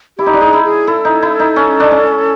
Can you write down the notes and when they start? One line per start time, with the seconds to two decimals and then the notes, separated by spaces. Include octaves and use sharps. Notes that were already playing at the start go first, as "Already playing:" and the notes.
0.18 E4 G4
0.26 D#4
0.34 D4
0.41 D#4 G#4
0.53 E4
0.64 G#4
0.87 E4 A4
1.05 D#4
1.22 E4
1.39 D#4
1.56 C#4
1.80 D4
1.91 C#4